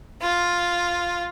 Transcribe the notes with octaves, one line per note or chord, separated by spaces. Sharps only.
F4